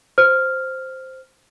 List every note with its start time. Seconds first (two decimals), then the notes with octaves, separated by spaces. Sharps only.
0.18 C5 F6